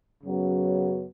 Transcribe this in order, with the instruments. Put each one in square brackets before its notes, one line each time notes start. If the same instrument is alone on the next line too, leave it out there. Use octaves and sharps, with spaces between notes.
[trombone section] F#2 C#3 F#3 B3